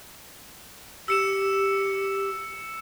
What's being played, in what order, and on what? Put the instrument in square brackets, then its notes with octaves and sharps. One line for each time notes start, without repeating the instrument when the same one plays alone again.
[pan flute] G4 [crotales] E6 C#7 E7